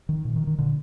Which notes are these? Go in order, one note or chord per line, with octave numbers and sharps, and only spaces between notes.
D#3
A#2
D#3
D#3
A#2 D3